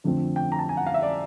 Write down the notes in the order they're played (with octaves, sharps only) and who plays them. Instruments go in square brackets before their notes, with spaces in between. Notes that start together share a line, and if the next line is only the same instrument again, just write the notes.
[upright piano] F2 D3 F3 A3 C4
G5
A#5
A5
G#5
F#5
F5
E5
D5